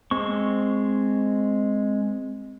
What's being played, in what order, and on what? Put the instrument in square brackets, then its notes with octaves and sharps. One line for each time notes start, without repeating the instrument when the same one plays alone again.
[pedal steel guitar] G#3 C4 C#6